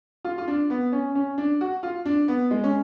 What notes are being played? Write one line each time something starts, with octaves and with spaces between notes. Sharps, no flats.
F4
F4
D4
B3
C#4
C#4
D4
F#4
F4
D4
B3
G#3
C#4